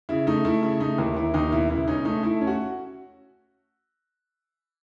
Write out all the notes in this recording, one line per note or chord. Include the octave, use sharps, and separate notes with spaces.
C#3 E4
A3 D#4
A3 E4
C#3 E4
A3 D#4
D#2 E4
D#2 E4
D#2 D#4
B2 E4
C#2 E4
C#4 D#4
A3 D#4
A3 E4
C#4
F#4